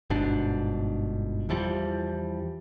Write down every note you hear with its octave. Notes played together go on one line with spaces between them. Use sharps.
G1 G#2 B2 D4
E2 E3 F3 G3